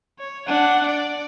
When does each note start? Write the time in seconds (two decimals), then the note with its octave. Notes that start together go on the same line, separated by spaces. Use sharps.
0.19 C#5
0.47 D4 F#5
0.86 D5